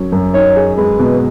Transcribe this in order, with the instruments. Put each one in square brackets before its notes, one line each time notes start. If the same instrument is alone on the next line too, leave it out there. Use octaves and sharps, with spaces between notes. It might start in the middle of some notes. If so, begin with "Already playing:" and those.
Already playing: [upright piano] F#2 F#3 C#4 F#4
F#2
[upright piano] D#4 [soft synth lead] C#5
[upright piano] G#4
[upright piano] G#3 [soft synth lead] B4
[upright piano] B2